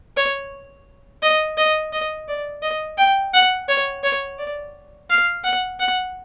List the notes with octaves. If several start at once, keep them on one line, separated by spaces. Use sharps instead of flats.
C#5
D#5
D#5
D#5
D5
D#5
G5
F#5
C#5
C#5
D5
F5
F#5
F#5